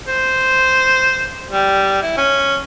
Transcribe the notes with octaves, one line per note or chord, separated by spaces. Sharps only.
C5
G3
E4
C#4